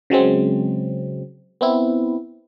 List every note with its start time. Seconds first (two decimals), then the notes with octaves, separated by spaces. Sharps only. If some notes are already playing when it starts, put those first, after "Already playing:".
0.10 C#3 F#3 G#3 C4
1.61 B3 C4 E4